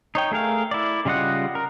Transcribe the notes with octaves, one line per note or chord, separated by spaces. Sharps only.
D#4 C#5 G5
A3 G#4 A#4 F5
E4 D5
C#3 G3 F4 D#5 F#5
A#4